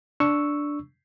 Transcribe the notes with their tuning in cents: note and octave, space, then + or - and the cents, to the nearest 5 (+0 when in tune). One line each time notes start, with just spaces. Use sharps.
D4 -5 C#6 +0 E6 +0